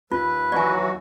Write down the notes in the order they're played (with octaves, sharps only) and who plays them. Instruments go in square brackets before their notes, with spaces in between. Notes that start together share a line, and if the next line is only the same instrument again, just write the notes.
[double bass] D#2 [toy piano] F4 [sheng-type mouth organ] B4
[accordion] E3 F#3 F#4 [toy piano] D5 G#5